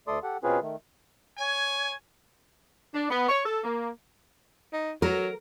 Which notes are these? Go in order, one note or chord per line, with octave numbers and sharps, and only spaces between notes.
D2 A3 A4 D5 C6 D#6
G4 A4 F#5
B2 C4 C#4 F4 G#4 B4
D#3 A3
C#5 G#5
D4
B3
C#5
A4
A#3
D#4
F#3 A#4